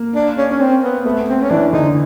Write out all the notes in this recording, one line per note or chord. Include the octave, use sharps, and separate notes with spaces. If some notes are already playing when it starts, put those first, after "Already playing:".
Already playing: A#3
D4
C#4
C#4
C4
B3
A3 B3
C4
C#4
E3 D4
D3 D#4